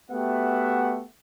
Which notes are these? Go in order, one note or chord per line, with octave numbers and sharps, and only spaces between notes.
A3 B3 F#4 G4 E5 F#5